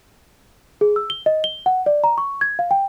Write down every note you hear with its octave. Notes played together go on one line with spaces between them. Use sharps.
G#4
E6
G7
D#5
G7
F#5
D5
A#5
C#6
G#6
F5
G5